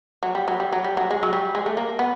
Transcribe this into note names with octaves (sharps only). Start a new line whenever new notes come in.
F#3
G3
F#3
G3
F#3
G3
F#3
G#3
F#3
G3
G#3
A3
A#3
B3